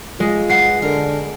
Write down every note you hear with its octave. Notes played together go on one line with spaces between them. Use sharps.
G#3 F4
B4 F#5 C7
D3 A#4